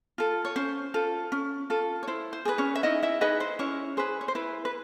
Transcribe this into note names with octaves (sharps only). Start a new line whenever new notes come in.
F4 A4
C#5
C#4 C5
F4 A4
C#4
F4 A4
C#5
E4 C5
C5
G#4 B4 D5
C#4 C#5
E5
D#4 E4 D#5
E4 E5
D#4 G#4 B4 D#5
C5
C#4 E4 C#5
G#4 B4 C5
C#5
C5
E4 B4
B4